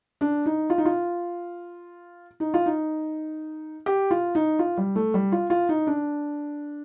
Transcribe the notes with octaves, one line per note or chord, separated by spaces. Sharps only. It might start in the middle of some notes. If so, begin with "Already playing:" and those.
D4
D#4
F4
D#4
F4
D#4
F4
D#4
G4
F4
D#4
F4
G3
A3
G3
F4
F4
D#4
D4